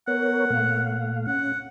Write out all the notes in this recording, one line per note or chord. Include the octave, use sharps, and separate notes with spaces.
B3 A#4 C#5 F#5
A#2 A3 F5
C#4 F#5